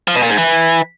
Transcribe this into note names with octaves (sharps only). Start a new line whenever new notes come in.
F3
B2
A#2
G#2
E3